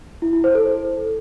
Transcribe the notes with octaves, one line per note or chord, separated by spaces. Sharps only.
E4
E4
C5
A4